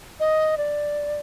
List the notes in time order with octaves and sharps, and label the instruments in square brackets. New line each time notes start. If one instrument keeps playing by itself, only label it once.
[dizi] D#5
D5